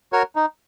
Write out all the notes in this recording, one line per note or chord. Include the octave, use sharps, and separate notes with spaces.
F#4 A#4 C#5
D#4